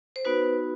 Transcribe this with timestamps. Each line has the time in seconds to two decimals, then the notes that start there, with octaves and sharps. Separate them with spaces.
0.16 C5
0.25 B3 D#4 F#4 B4